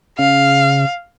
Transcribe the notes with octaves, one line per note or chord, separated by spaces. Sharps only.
C#3 F5